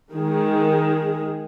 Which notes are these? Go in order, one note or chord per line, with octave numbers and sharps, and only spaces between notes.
D#3 G#3 G#4